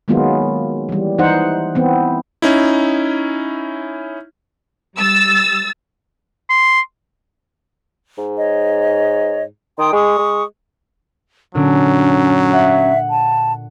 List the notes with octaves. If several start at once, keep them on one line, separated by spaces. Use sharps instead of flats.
D#3 F#3 G#3 A#3 B3 F4
E3 G3
E3 D#4 C5 F#5
E3 B3 C4
C#4 D#4 E4
G3 E6 A6
C6
G#2
C#5 D#5
D#3 G5 C6 D#6
G#3 C#6 D#6
G#3
A#2 D3 F#3 C#4 D4
E5 F#5
A5